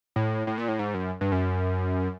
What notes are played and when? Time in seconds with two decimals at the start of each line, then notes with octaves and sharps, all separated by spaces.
0.16 A2
0.47 A2
0.58 A#2
0.68 A2
0.79 G#2
0.94 F#2
1.21 G2
1.32 F#2